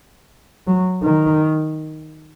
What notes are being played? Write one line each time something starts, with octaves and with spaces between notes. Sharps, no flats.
F#3
D#3